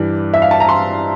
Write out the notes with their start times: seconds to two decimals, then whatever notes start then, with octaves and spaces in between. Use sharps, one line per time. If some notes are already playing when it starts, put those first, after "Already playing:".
Already playing: G2 E3 D5
0.34 E5
0.42 F5
0.51 A5
0.60 A#5
0.69 C6